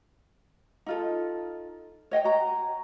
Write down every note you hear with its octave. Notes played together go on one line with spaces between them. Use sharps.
D#4 F4 A4
C#5 D#5 F#5 G5
F#4 A#5